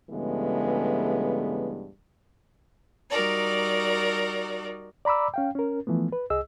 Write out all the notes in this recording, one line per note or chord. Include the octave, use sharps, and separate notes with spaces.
G2 C#3 E3 G#3 A3 B3
G3 D#4 F#4 A#4 D5
D5 A#5 B5 D6 E6
C#4 F5 G5
C#4 A#4
E3 F3 A3 B3
B4
C2 G#4 D#5 E6